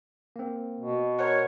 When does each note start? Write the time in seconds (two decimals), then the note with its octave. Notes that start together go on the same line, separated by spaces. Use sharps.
0.36 A#3 C4
0.80 B2
1.19 A#4 C5 C#5 F#5